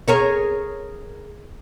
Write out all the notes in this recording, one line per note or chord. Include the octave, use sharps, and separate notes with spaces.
G#4 A#4 C#5